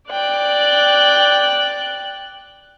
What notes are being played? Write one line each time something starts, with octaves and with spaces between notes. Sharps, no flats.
D5 G5 F#6